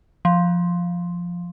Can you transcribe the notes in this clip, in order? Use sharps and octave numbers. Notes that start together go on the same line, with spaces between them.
F3